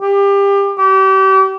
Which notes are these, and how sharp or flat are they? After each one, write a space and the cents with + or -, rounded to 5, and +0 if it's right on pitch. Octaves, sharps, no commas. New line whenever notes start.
G4 +25
G4 -35